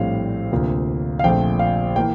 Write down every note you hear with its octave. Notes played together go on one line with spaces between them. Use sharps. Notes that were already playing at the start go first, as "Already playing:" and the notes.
Already playing: A#1 A2 G3 C4 F5
D2 C3 F3 A#3
F5
A#1 A#2 F3 A3 C4 G5
F5
E3 A#3 G5